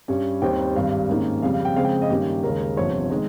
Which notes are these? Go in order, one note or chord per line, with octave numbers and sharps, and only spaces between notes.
G2 G3 C#4
D#2 D#3 G3 C4 G5
G#1 G2 G3 F5
G#2 D#3 A#3 C#4
F2 C#3 G3 F5
F5
G5
F2 C#3 G#3 C4 F5
G5
D#5
G2 D#3 A#3 C#4 G4
D#2 C#3 G#3 A#4
G1 F2 C3 F3 C#5
D#3 G#3